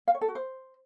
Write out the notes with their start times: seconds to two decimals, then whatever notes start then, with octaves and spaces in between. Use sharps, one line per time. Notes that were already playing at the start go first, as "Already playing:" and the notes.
0.08 F5
0.14 C#5
0.21 A4
0.28 F#4
0.35 C5